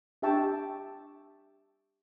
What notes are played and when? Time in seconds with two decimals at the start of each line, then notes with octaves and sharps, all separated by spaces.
0.22 D4 G4 E5 G5 A5 C#6